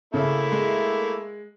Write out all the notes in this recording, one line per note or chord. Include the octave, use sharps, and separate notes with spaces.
C#3 A3 A#3 E4
G#3